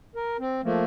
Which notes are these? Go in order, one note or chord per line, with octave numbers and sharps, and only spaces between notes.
A#4
C4
F3 A3 A#3